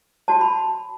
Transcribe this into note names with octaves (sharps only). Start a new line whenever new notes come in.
F#4 C#5 A5
B5